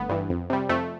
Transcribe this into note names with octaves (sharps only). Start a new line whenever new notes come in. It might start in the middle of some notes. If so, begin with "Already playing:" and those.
Already playing: G1 A3 B3
G2 E3
F2
C3 G3
F2 A3